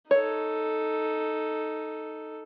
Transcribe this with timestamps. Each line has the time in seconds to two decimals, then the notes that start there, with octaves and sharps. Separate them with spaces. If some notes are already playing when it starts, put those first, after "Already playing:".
0.11 D#4 A4 C#5